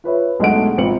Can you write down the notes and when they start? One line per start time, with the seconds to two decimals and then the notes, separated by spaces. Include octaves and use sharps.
0.04 F4 B4 C#5 E5
0.39 B1 G#3 A3 D4 F#5 D7
0.78 G#1 C4 F4 C#7 F#7